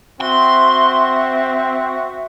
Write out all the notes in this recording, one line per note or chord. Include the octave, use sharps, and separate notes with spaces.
C4 F#4 E5 C6